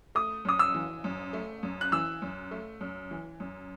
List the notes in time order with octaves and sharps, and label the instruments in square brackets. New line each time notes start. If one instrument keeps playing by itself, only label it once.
[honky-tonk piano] A3 [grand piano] D#6
[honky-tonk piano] F#2 [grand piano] D#6
[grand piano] E6
[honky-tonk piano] E3
F#2
A3
F#2
[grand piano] F#6
[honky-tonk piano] E3 [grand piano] E6
[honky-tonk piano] F#2
A3
F#2
E3
F#2